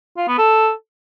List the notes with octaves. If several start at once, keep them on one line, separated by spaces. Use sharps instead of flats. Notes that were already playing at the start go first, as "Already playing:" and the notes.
F4
B3
A4